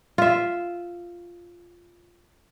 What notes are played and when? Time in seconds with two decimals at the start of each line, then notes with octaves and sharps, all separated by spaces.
0.18 F4 E5